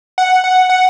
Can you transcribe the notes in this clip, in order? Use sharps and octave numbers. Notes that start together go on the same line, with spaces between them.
F#5
F#5
F#5